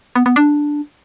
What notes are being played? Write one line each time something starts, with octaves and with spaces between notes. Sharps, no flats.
B3
B3
D4